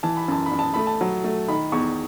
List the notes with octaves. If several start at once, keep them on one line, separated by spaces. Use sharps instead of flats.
E3 A5
B5
F#2 A5
B5
F#2
A5
A3 B5
A5
F#3
A3
D#3 B5
E2 C#6